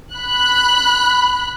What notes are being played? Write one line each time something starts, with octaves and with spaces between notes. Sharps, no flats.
B5 F#6